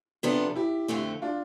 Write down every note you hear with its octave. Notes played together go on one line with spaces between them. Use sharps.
C3 F3 B3 D4 A4
E4 G4
F2 D3 A3 C4
D4 F4